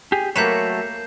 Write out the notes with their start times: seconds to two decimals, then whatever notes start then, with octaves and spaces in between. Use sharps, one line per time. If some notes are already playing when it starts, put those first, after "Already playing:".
0.12 G4 G#4
0.36 F#3 A3 A#3 B4 C#5 G6 C7 E7